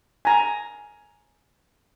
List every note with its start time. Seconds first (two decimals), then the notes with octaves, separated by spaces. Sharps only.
0.25 G#5 A#5